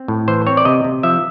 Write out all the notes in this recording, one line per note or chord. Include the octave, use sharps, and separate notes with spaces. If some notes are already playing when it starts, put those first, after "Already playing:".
Already playing: C4
A2
E3 C5
C4 C#5
D5
C3 D#5
C3
F3 E5